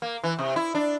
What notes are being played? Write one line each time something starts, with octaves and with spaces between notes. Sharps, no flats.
A#3
E3
C3
E4
D4